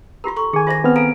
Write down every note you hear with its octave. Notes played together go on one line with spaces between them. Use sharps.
F4 G4 A#4 A#5 C6
A4 A#5 C#6
D#3 G#4 G#5
F4 C5 E5 D6 A#6
B3 C4 F6
A4 F5 A#5 D7